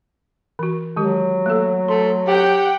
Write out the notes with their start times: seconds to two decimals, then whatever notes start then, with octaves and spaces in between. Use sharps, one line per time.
0.59 E3 F#4
0.96 D#3 F#3 G#3 G4
1.46 A3 A#3 A4
1.88 A3 C6
2.28 G4 F#5 G5